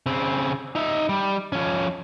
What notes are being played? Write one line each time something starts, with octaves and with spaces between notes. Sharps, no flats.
C#3 C4
D#4 E5
G3
F3 C#4